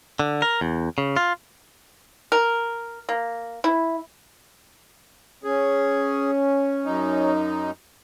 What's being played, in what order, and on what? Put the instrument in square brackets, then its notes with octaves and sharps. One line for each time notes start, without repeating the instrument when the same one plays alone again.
[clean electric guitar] D3
A#4
E2
C#3
F4
[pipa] A#4
A#3
E4
[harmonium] C#4 [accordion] G#4
[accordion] F#2 D#4